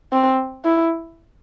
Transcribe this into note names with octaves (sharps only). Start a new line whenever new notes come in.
C4
E4